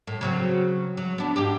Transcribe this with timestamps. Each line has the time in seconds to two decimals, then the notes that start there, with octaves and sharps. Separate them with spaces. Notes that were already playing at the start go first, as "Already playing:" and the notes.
0.07 A2
0.21 C#3 F#3 C4
0.97 F#3
1.18 B3 D4
1.36 G#2 G4